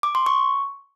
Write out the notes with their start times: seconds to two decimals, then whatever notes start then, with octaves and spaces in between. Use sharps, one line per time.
0.03 D6
0.15 C6
0.26 C#6